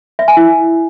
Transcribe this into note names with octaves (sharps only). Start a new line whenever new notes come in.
E5
G#5
E4